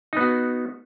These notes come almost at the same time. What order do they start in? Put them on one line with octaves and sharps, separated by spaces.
D#4 B3 F#4